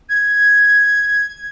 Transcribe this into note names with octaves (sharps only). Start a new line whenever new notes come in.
G#6